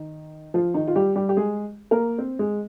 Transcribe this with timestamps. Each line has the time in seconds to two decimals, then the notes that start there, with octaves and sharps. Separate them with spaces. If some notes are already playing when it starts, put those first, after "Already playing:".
Already playing: D#3 D#4
0.54 F3 F4
0.74 D#3 D#4
0.88 F4
0.96 G3 G4
1.16 G3 G4
1.29 G4
1.37 G#3 G#4
1.91 A#3 A#4
2.18 C4 C5
2.39 G#3 G#4